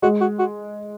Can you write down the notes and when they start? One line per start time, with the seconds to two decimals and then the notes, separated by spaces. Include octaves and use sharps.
0.02 G#3 F#4
0.21 F#4
0.39 F#4